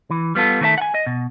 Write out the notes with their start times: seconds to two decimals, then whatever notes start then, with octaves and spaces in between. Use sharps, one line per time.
0.11 E3
0.35 G3 B3 F4 A4
0.61 D#3 A3 G#4 C#5 E5 A5
0.78 F#5 G#5
0.94 D#5
1.07 B2